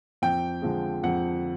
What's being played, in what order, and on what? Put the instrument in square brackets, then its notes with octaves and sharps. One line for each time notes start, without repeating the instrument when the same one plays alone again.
[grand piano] F2 G5
D3 F3 G#3
F2 F#5